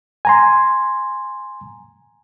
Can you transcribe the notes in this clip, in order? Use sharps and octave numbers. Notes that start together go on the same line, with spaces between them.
G#5 A#5 C6